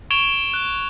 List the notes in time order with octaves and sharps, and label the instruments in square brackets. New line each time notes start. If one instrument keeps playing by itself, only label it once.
[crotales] C#6 G#6 D7 E7 F7 G7
F#6